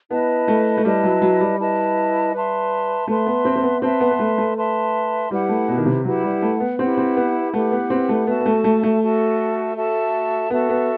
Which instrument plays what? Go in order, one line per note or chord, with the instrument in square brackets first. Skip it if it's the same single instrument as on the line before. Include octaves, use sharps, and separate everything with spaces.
[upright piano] B3 [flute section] E4 B4 D#5 A5
[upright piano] A3
A3
[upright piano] G3 [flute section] E4 B4 D#5 A5
[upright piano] F#3
F#3
G3
[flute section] E4 B4 D#5 A5
B4 E5 A5 C6
[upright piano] A3 [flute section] B4 E5 A5 C6
[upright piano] B3
C4
C4
B3
[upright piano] C4 [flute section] B4 E5 A5 C6
[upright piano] B3
B3
A3
A3
[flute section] B4 E5 A5 C6
[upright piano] G3 [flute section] E4 G4 B4 F#5
[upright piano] A3
B2
D#3
C3
[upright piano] F#3 [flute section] E4 G4 B4 F#5
[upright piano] G3
A3
B3
[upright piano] C4 [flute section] E4 G4 B4 F#5
[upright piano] C4
B3
[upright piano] A3 [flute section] E4 G4 B4 F#5
[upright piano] B3
C4
A3
[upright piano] B3 [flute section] F#4 A4 E5 A5
[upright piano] B3
A3
A3
A3
[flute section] F#4 A4 E5 A5
F#4 A4 E5 A5
[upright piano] B3 [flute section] F#4 A4 E5 A5
[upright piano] B3